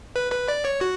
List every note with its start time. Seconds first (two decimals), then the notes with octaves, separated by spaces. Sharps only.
0.16 B4
0.32 B4
0.48 D5
0.65 C#5
0.81 F#4